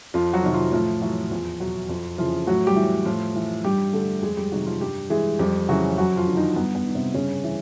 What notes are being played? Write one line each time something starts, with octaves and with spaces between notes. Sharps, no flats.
F2 F3 F4
F#3 F#4
C3 D#3
F3 F4
A2 F3 F4
E3 F#3 F#4
E2 F3 F4
B2 F#3 F#4
F2 F3 F4
C#3 E3 F3 F4
A2 F#3 F#4
G3 G4
E3
A2 F3 F4
E3
G2 G3 G4
D3 A3 A4
F2 G#3 G#4
G3 G4
C3 D#3 F#3 F#4
F3 F4
G2 G3 G4
E3 G#3 G#4
F2 G3 G4
C#3 E3 F#3 F#4
F#2 F#3 F#4
F3 F4
D3
D#3 D#4
G2 B3
B3
D#3
C3 C4
G2 C#3 C#4
E3